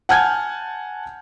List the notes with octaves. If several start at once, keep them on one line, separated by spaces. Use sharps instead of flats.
F#5 G#5 A5 F6 G6 G#6